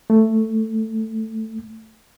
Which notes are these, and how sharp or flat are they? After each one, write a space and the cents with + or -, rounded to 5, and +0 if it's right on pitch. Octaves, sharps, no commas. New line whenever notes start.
A3 +10